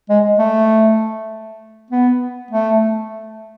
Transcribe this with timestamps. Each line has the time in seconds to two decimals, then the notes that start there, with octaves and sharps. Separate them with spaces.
0.10 G#3
0.39 A3
1.91 B3
2.51 A3